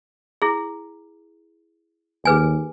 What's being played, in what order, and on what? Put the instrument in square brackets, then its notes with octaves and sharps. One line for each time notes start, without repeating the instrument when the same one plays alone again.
[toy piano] E4 G#4
[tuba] D#2 [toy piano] G#4 B4 G#5